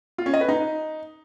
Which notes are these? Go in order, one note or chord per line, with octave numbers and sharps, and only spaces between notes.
F4
C#4
D#5
B4
D#4